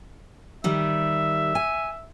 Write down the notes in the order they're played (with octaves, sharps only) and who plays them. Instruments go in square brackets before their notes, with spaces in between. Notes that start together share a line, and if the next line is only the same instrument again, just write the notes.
[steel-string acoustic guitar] D#3 G3 [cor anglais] E5
[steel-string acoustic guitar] G#5